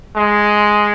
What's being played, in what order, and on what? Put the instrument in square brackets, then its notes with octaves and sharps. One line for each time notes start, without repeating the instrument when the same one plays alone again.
[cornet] G#3